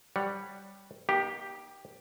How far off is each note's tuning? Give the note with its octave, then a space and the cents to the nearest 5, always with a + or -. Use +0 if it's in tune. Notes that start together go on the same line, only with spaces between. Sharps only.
G3 +0 C#5 +0 F#5 +5
A#3 +45 D#4 +0 G4 +0